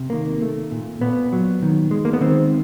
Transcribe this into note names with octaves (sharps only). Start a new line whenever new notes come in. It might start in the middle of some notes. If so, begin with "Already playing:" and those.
Already playing: C3
D#3 A#3
A3
A#2
A#2 B3
F#3
D#3
G#3
A#3
B3
D#3 C4